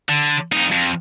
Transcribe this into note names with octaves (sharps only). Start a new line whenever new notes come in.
D3
F2 D#4
F2